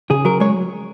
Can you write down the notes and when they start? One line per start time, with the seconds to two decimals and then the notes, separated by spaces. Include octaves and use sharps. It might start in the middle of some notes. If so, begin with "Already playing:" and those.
0.10 C#3 G#4
0.25 F#3 A#4
0.40 G#3 C#5